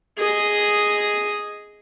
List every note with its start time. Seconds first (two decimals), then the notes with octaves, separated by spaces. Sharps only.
0.18 G#4 D#5